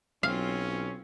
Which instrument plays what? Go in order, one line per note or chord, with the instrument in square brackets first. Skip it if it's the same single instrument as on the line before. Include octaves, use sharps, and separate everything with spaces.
[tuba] B1 [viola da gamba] F#3 C4 F4 [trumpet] C#4 [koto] F5